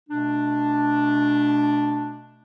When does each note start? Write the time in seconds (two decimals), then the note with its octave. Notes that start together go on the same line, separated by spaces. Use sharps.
0.09 B2 A3 D4